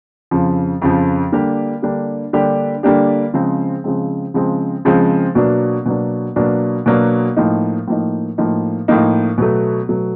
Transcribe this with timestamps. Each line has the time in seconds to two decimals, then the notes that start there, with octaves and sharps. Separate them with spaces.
0.31 F2 C#3 F3
0.82 F2 C#3 F3
1.32 D3 G3 A#3 D4 G4
1.82 D3 G3 A#3 D4 G4
2.33 D3 G3 A#3 D4 G4
2.83 D3 G3 A#3 D4 G4
3.34 C#3 F3 G#3 C4
3.84 C#3 F3 G#3 C4
4.34 C#3 F3 G#3 C4
4.85 C#3 F3 G#3 C4
5.35 B2 F#3 A#3 D4
5.86 B2 F#3 A#3 D4
6.36 B2 F#3 A#3 D4
6.86 B2 F#3 A#3 D4
7.37 A2 F3 A#3 D#4
7.88 A2 F3 A#3 D#4
8.38 A2 F3 A#3 D#4
8.88 A2 F3 A#3 D#4
9.38 B2 F#3 A3
9.89 B2 F#3 A3